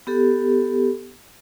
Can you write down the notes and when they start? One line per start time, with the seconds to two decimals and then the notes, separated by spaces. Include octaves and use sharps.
0.07 B3 G4 A4